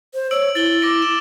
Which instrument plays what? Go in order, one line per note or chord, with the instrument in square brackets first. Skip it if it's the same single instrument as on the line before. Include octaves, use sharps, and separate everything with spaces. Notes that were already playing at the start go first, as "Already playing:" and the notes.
[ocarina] C5
[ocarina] C#5 [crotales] E6 D7 F#7
[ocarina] E4 [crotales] A6 F#7 G7
[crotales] D6 A#6 D7
E7